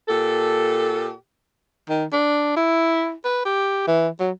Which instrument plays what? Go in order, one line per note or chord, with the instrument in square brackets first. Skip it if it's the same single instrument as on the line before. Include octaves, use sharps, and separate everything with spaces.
[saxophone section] A#2 G4 A4
[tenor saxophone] D#3
D4
E4
B4
G4
E3
F#3